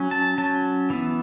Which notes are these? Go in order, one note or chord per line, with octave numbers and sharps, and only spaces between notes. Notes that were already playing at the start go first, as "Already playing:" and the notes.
Already playing: F#3 C#4
A5
F#3 C#4 A5
E3 B3